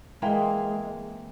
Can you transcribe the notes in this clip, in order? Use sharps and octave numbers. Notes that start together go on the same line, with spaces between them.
E3 G#3 A#3 C4